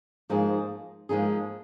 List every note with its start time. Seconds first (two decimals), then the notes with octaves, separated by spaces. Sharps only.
0.29 G#2 F3 A#3 D#4 G#4
1.09 G#2 F3 A#3 D#4 G#4